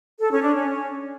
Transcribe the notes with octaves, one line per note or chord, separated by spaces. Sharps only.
A4
C#4
D4
C#4